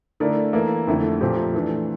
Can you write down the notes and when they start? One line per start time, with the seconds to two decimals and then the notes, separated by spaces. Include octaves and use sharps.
0.20 D3 A3 E4 A#4 D5
0.53 E3 A#3 E4 A4
0.87 F2 D3 A3 E4
1.21 A#2 F3 A3 C4 G4
1.54 E3 A3 D4 A4